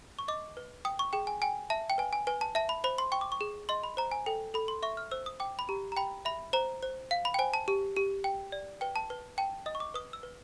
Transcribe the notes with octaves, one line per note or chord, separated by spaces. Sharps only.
C#6
D#5 D6
B4
G5 D#6
C#6
G#4 G5
G#5
G5 G#5
E5 A5
G5
B4 G#5
G#5
B4 G#5
A5
E5 A5
B5
C5 B5
C6
G5 C#6
D6
C#6
G#4
D#5 C6
B5
C5 A#5
G#5
A4 G5
A4 B5
C6
E5 C#6
F6
C5 E6
D#6
G5 D6
B5
G4 A#5
A#5
G5 B5
E5 B5
C5 A#5
C5
F5
B5
G5
C5 G#5
A5
G4
G4
G5
D5
B4 G5
A5
B4
G5 A5
D#5 D#6
C#6
D6
B4 D#6
E6
B4